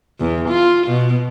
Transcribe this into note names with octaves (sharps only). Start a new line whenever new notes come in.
E2
F4
B2